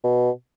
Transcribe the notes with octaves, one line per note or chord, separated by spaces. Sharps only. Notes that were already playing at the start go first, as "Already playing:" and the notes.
B2